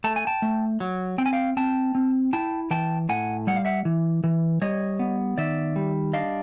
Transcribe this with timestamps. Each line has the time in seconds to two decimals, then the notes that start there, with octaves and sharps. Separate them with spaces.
0.04 A3 A5
0.16 G#5
0.27 G5 A5
0.42 A3
0.80 F#3
1.18 C4 G5
1.26 G#5
1.33 F5 G5
1.57 C4 G5 A5
1.95 C4
2.33 E4 G5 A5
2.71 E3 G5 A5
3.09 A2 F#5 G#5
3.47 G3 F#5
3.56 F5
3.65 E5 F#5
3.85 E3
4.24 E3
4.62 G3 C#5 D#5
4.99 B3
5.38 D#3 D5 E5
5.76 G3
6.13 D4 D#5 F5